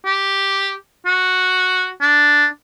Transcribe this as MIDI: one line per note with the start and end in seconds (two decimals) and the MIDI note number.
0.05 0.73 67
1.06 1.90 66
2.01 2.47 62